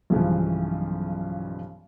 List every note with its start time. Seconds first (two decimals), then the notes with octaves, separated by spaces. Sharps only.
0.10 B1 G2 C#3 E3 F3